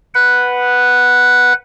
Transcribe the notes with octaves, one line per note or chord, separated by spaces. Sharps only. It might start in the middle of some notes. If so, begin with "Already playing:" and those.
B4 F#5